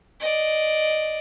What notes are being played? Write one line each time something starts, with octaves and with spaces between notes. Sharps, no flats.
D5 D#5